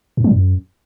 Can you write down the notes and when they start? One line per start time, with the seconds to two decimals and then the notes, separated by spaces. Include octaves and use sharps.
0.17 G2
0.24 F#3
0.31 F#2